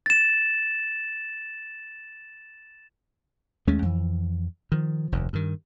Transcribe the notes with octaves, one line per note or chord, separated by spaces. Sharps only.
A6 E7
D#2 G#3 A3 C#4
F2 E3
D#3 F3
F1 D#2
G2 D#3